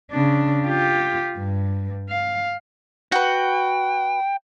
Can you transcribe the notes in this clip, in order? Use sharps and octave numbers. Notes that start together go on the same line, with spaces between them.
C#3 D4
F4 G4
G2
F5
F#4 B4 G5